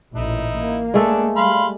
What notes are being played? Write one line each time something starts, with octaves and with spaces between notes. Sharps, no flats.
A1 A#2 D#4 E4
A#3
G#3 A3 D4 A4
G3 F5 B5 C6